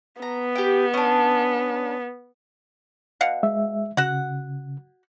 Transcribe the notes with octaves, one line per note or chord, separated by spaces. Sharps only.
B3 A#5
G4 G5
C#4 D4
B2 F5 F#5
G#3 E5
C#3 F#4 F#5